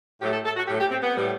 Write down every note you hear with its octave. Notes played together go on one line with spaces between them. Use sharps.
A2 F#3 A3 G4
A4
A4
F#4
A2 F#3 A3 G4
G4
C4
B3
A2 G3